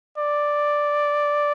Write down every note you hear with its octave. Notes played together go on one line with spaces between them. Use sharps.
D5